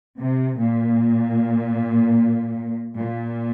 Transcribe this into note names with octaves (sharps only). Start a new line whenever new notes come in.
C3
A#2
A#2